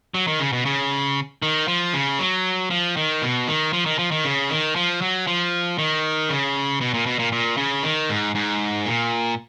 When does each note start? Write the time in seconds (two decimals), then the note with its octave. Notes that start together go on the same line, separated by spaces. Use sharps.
0.14 F#3
0.27 D#3
0.39 C#3
0.53 B2
0.65 C#3
1.42 D#3
1.68 F3
1.94 C#3
2.19 F#3
2.70 F3
2.97 D#3
3.22 B2
3.48 D#3
3.73 F3
3.86 D#3
3.99 F3
4.11 D#3
4.25 C#3
4.50 D#3
4.76 F3
5.01 F#3
5.27 F3
5.78 D#3
6.30 C#3
6.81 B2
6.94 A#2
7.06 B2
7.19 A#2
7.32 A#2
7.57 C#3
7.83 D#3
8.09 G#2
8.35 G#2
8.86 A#2